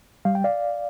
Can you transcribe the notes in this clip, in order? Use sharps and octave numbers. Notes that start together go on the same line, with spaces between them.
G3 F5
G5
D5 F5